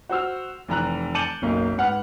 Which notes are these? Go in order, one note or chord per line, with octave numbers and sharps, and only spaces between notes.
F#4 C5 E6 F6
F1 E3 A#5 F#6
A5 D6 G6 C#7 D#7 F#7
F#1 B1 A#3 D#5
G#2 B4 F#5 F6